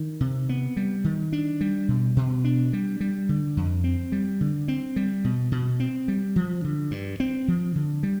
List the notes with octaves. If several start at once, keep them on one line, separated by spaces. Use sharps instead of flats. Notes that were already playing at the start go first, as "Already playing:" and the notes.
Already playing: D#3
C3
B3
G3
D#3
D4
G3
B2
B2
D4
G3
G3
D3
F2
C4
G3
D3
C4
G3
B2
B2
C4
G3
F3
D3
G2
C4
F3
D3
G3